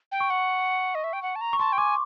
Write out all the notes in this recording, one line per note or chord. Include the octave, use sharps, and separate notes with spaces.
G5
C#6
F#5
D#5
E5
G5
F#5
A5
A#5
C#6
A5 C6
G5
G#5 D6